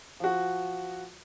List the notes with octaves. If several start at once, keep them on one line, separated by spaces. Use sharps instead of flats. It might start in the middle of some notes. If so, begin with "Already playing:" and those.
F3 F#4